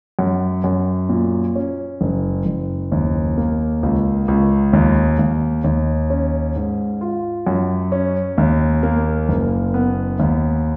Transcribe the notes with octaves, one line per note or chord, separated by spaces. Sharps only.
F#2
F#2
A#2
C#4
F#1
F#1
D#2
A#3
C#2
C#2
D#2
D#2
D#2
C#4
G#2
F4
F#2
C#4
D#2
A#3
F#1
B3
D#2